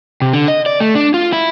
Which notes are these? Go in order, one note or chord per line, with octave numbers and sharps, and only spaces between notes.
C3
D3
D#5
D5
A3
D4
F4
E4